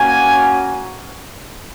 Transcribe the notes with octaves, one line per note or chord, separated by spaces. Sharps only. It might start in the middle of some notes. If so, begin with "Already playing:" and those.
Already playing: A#3 C#4 F#4 G#5